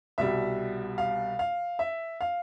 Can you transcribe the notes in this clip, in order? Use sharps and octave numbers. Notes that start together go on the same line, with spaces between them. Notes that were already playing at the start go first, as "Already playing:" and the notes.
C2 B2 G3 E5
F5
F5
E5
F5